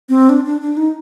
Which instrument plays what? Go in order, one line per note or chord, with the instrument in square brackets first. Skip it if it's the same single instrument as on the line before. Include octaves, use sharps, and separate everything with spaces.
[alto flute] C4
D4
D4
D4
D#4